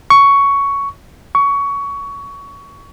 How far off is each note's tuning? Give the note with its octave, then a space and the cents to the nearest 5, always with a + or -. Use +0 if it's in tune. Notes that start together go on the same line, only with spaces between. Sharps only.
C#6 +10
C#6 +20